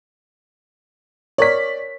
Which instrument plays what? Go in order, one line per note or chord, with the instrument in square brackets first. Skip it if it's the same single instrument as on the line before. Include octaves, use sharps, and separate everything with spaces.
[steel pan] A#4 C#5 [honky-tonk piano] D5 B6